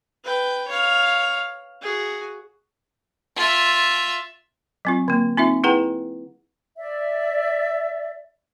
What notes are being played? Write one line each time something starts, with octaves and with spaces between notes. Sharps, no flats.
B4 G5
C#5 F5
F#4 G#4
F4 E5
F#3 C4 F4
D3 A#3
C4 D#4 F4 E5
E4 G#4 B4 F#5 G5 A#5
D5 E5